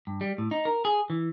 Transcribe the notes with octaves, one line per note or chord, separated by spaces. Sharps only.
G2
G3
A2
D#4
A#4
G#4
E3